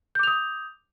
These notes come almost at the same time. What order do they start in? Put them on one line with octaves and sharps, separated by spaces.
G6 D6 F7 D#6